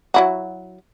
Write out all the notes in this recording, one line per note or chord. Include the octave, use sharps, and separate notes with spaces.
F#3 E4 F#4